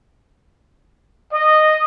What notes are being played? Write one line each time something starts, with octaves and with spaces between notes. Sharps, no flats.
D#5